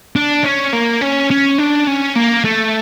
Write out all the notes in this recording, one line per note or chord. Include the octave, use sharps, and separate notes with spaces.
D4
C#4
A#3
C#4
C#4
D4
C#4
A#3
A3